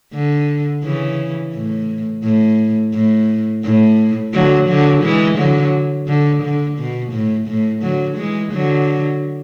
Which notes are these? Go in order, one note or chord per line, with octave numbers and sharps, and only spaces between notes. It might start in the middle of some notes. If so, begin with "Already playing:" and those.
D3
C#3 E3
A2
A2
A2
A2
D3 F#3
D3 F#3
E3 G#3
D3 F#3
D3
D3
B2
A2
A2
D3 F#3
E3 G#3
D3 F#3